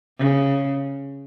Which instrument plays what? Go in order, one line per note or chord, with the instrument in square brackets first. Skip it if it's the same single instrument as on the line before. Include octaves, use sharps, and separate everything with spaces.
[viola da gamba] C#3